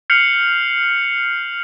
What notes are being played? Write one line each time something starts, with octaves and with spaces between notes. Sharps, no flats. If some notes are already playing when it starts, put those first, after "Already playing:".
F6 G6 C7 C#7 F7 F#7